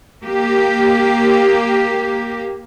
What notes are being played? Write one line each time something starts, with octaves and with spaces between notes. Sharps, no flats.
A#3 G4